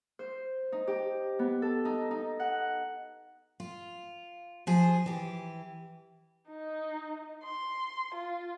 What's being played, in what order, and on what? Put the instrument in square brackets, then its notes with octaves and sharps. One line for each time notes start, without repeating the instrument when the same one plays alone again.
[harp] C5
D#4
G4
B3
A4
D#4
D#4
F#5
[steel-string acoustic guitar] F4
F3 G#4
E3 G4
[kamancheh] D#4
C6
F4